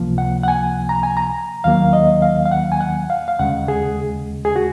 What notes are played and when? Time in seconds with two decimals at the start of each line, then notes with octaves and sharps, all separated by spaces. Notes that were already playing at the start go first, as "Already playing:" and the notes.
Already playing: C#2 C3 F3 A#3
0.18 F#5
0.43 F#5
0.48 G#5
0.89 A#5
1.03 G#5
1.17 A#5
1.64 D#2 D#3 F#3 A#3 F5
1.93 D#5
2.22 F5
2.46 F5
2.52 F#5
2.72 G#5
2.81 F#5
3.10 F5
3.28 F5
3.39 D#2 C#3 G#3 F#5
3.68 G#4
4.45 G#4
4.56 F#4